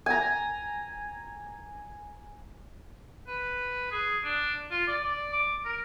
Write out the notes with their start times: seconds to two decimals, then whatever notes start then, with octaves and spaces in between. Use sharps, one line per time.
0.06 G#5 A#5
3.27 B4
3.92 G#4
4.24 D4
4.71 F4
4.87 D5
5.04 D5
5.33 D6
5.65 A#4